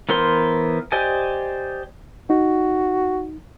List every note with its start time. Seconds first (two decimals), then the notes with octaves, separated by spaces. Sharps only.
0.09 E3 B3 A#4 C5 C6
0.92 G4 C5 D5 D#5 G#5
2.30 D#4 F#4